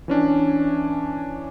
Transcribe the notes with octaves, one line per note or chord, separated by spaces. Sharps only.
E3 C#4 D4